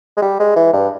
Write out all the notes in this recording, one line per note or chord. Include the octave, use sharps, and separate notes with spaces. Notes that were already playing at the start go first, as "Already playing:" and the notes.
G#3
G3
G#3
E3
G2